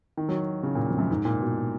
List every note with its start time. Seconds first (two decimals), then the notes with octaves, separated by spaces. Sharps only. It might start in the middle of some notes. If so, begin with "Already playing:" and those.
0.17 D#3
0.29 F#3
0.63 C#3
0.75 A#2
0.91 F2
0.98 F#2
1.11 G#2
1.25 A#2
1.40 B2